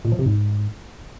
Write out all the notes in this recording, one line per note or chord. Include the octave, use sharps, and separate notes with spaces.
A#2
F3
C3
G#2